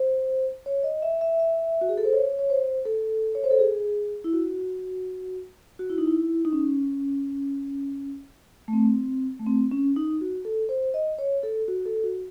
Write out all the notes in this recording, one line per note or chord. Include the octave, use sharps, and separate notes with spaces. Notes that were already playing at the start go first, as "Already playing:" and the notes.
Already playing: C5
C#5
D#5
E5
E5
E5
F#4
G#4
A4
C5
C#5
C#5
C5
A4
C#5
C5
A4
G#4
E4
F#4
F#4
E4
D#4
E4
D#4
C#4
A3
C4
A3
C4
C#4
D#4
F#4
A4
C5
D#5
C#5
A4
F#4
A4
F#4